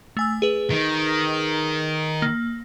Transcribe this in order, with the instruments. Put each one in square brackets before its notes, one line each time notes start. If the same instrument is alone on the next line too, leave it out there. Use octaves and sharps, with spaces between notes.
[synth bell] A3 G#5 E6
G#4 B4
[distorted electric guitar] D#3
[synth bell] A#3